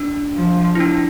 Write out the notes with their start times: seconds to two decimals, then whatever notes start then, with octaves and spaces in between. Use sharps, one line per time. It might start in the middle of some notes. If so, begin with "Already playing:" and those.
Already playing: D4
0.35 F3
0.75 E4
0.80 D4